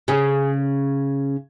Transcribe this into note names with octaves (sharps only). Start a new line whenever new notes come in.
C#3 C#4 G#4